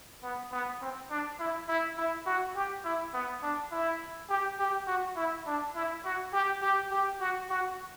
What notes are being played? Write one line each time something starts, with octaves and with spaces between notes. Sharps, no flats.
B3
B3
C4
D4
E4
E4
E4
F#4
G4
E4
B3
D4
E4
G4
G4
F#4
E4
D4
E4
F#4
G4
G4
G4
F#4
F#4